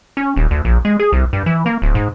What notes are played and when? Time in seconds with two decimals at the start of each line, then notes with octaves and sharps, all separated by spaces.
0.17 C#4
0.36 D#1
0.51 D2
0.65 A#1
0.85 G#3
0.99 G#4
1.12 C2
1.33 G2
1.46 E3
1.66 A#3
1.82 D1
1.95 G#2